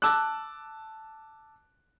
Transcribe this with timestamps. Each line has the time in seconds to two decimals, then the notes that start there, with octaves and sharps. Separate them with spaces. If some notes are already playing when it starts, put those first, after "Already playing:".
0.02 A5 D6 E6 F#6